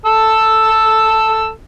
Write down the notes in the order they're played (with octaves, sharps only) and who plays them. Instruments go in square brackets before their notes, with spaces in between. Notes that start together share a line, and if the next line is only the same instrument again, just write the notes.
[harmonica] A4 E6